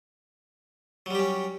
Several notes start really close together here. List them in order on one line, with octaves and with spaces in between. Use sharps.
F#3 G3 G4 C#4